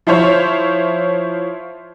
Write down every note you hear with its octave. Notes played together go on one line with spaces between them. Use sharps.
F3 E4 F4 C5 C#5